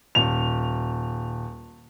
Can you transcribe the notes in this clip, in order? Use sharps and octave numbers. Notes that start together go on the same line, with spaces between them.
D#1 F7